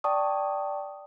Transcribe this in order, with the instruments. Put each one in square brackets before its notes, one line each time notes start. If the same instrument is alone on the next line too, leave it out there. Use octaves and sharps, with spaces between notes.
[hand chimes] D5 G5 A5 C#6 D#6